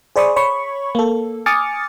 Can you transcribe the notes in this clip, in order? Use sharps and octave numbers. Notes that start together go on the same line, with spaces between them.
G#4 C5 D5 B5 C#6 D#6
C#5 B5 C#6
A#3 A4
G#5 D6 D#6 F6 A6 C#7